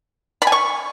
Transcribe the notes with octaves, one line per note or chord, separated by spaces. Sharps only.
B5
G#5
C#6